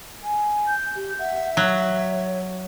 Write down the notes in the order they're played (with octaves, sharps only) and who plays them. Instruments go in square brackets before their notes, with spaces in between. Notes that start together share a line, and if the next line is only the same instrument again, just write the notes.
[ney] G#5
[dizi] G6
[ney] G4
[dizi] E5 [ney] F#5
[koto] F#3 [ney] C#5